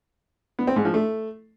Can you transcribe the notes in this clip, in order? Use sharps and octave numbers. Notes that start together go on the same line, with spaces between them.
B3
C4
G#2
F3
A3